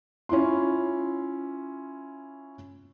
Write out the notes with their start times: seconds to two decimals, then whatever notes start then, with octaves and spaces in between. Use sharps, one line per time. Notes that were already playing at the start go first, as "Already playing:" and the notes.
0.29 C#4 E4 F4 C6